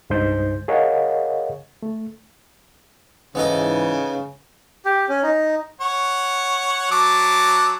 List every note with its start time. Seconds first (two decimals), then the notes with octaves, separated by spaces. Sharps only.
0.10 C2 G2 G#3 D#4 C5 G6
0.68 G#4 A#4 C#5 D#5 F5 F#5
1.83 A3
3.35 G#2 C#3 E3 B3 D#4 A4
4.85 G4
5.09 C#4
5.23 D#4
5.81 C#5 F#5
6.91 F#3 A5 D6